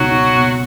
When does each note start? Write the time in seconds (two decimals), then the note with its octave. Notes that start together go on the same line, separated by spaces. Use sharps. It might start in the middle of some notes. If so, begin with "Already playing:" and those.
Already playing: C#2 B2 F#3 D#4 F#4
0.11 D#4
0.35 B2